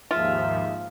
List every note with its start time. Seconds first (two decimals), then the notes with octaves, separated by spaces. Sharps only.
0.11 D#2 G#2 F3 F4 E5